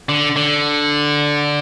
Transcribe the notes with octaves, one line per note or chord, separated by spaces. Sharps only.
D3
D3